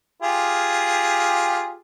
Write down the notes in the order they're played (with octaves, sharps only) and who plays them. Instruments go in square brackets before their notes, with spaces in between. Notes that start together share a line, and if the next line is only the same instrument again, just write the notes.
[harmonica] F4 G4 G#4